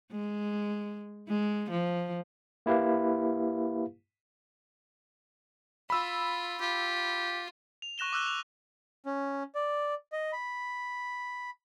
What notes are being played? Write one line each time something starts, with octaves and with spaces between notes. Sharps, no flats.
G#3
G#3
F3
A#3 E4 G4 B4 F5
F4 B5 E6
F4 G4
F7
C#6 F#6 A#6 E7 G7
D6 E6 F#6 G7
F7
C#4
D5
D#5
B5